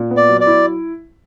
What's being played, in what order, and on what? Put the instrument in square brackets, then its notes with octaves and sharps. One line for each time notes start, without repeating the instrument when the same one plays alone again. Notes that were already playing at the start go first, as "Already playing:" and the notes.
Already playing: [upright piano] A#2
B3
[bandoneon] D5
[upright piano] F#3
[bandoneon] D5
[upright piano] E4